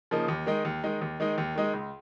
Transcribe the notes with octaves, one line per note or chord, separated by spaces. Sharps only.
C#3 F3 A#3 D#4
D#2
D#3 G#3 D#4
D#2
D#3 G#3 D#4
D#2
D#3 G#3 D#4
D#2
D#3 G#3 D#4
C#2